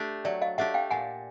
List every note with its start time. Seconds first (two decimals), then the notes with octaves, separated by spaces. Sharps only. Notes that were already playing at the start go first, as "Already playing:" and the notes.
Already playing: A3 D4 G4
0.25 F#3 D5 E5
0.41 D#5 F5
0.58 A3 D4 G4 E5 F#5
0.74 F5 G5
0.91 A#2 F#5 G#5